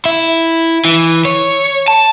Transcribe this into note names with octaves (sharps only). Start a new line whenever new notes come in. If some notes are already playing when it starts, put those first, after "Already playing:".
E4
E3
C#5
A5